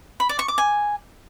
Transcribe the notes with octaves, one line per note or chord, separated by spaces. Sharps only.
B5
D5
C#6
D6
G#5